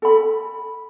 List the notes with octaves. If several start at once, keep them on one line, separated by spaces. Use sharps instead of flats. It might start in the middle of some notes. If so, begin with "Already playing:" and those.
A4 B5